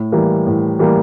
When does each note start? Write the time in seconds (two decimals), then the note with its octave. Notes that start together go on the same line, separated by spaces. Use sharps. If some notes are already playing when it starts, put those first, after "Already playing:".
Already playing: A2
0.12 E3 G3 A#3
0.46 A2
0.79 E3 G3 A#3